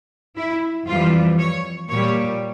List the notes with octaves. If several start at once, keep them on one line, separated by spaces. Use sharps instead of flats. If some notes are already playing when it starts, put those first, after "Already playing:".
E4
F2 E3 G3 F4
C#5
A#2 G3 C#5